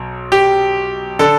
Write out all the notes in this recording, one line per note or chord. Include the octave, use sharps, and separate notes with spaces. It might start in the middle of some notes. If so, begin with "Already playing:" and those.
Already playing: B1 B2
G4
D3 A4